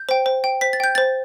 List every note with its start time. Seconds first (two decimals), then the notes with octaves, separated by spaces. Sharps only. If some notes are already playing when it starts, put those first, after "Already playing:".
Already playing: G6
0.09 C5 G5
0.26 C5
0.44 G5
0.61 C5 B6
0.73 A6
0.80 G5 G6
0.95 C5 A6